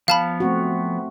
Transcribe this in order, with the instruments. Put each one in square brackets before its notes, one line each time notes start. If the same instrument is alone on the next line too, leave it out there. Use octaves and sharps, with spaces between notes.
[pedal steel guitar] F3 B3 F6 [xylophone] F5 A5 B5
[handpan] A3 C4 F#4